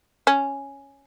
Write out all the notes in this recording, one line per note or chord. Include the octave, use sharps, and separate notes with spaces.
C#4